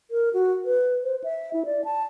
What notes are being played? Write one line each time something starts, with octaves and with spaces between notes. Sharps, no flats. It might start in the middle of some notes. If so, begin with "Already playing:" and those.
A#4
F#4
B4
C5
E5
E4
D5
A5